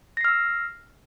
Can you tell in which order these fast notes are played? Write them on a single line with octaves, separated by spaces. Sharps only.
A#6 C7 F6 E6